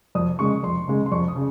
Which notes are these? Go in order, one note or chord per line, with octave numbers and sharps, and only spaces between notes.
F2 D#6
C#3 G#3 C#6
F2 C6
C#3 G#3
C6
F2 C#6
D#6
C#3